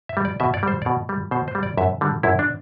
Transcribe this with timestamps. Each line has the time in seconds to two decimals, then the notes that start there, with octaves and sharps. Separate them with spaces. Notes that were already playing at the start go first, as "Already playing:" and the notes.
0.09 E5
0.17 G3
0.25 D5
0.40 B2 E5
0.54 D5
0.63 G3 C5
0.82 B2 D5
1.09 G3
1.31 B2 C5
1.48 C5
1.55 G3
1.63 D5
1.77 F#2 E5
2.01 D3 G3
2.23 F#2 E4
2.39 D4